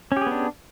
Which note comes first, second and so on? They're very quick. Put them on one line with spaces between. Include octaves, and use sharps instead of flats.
C#4 G4 G#4 B3 D4